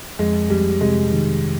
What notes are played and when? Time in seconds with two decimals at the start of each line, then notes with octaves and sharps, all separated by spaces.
0.19 F2 G#3
0.50 F2 G3
0.81 C3 G#3
1.12 D#3